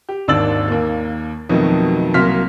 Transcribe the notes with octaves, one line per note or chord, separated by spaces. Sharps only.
G4
G#1 D#2 D4 E6 A6 F#7
D#2 A#3
F2 B2 D#3 F#3 A3
C2 F#3 A#3 C6 F6 B6